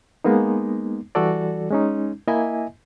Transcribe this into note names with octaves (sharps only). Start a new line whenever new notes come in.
G#3 A#3 B3 D#4
E3 G3 F#4 A4 D5
G#3 C#4 D#4
A#3 E4 D#5 E5 G#5